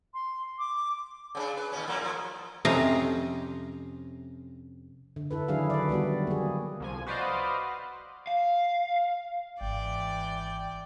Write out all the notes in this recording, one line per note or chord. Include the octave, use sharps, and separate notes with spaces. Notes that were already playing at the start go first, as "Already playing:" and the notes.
C6
D6
C#3 C4 D4
B4
D#2 B2 C#4
A2 F#3 A#3
A2 F3
F2 C3 C#4 C5 D#5 A#5
D3
E4 A4 B4
D#3 F#3 D4 E4 G#4 F5
B4 D5
F#3 G3 B3 F#4
A#3 G#4
C2 F3 G#5
F#4 B4 C5 D5 D#5 F5
F5
G#1 E3 D5 G5